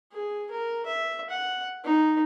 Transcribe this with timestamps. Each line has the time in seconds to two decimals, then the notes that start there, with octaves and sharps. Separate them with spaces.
0.12 G#4
0.51 A#4
0.86 E5
1.30 F#5
1.84 D#4